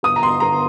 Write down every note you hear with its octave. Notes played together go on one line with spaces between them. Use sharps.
G1 D#6
A#5
C6
G1 A#5